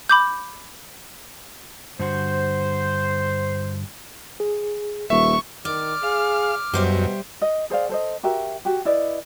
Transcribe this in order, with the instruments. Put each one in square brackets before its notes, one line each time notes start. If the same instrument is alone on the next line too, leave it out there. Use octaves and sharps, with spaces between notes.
[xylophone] B5 D6 G6
[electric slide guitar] G2 D3 F#4 [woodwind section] C5
[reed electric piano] G#4
[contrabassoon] D#1 [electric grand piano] E5 [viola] C#6
[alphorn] D#3 [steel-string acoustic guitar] D5 [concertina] D6 F6
[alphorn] G#4 [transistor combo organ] F5
[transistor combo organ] F#2 [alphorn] B2 [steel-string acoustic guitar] G3 C5 E5
[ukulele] D#5
G#4 C5 D5 F5
A4 C5 D#5
F#4 G4 A#4 E5
F#4 G4
E4 B4 D5 D#5